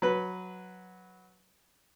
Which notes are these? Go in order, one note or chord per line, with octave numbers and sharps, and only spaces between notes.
F#3 B4